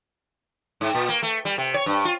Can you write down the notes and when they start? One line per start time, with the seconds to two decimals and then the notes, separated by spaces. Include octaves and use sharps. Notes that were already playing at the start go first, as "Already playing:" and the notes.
0.81 G#2
0.95 A#2
1.09 A#3
1.23 A3
1.45 G3
1.58 C3
1.74 C#5
1.86 G2
2.05 F4